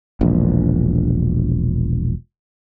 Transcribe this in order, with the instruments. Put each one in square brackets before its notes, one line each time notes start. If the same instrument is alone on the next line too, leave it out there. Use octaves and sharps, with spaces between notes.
[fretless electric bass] E1 A#1